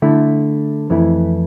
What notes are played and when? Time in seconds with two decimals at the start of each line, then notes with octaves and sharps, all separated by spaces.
0.02 D3 A3 E4
0.90 F2 E3 A3 E4